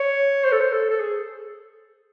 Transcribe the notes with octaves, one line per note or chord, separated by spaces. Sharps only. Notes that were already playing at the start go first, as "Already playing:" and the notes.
Already playing: C#5
C5
A4
C5
A4
A4
G#4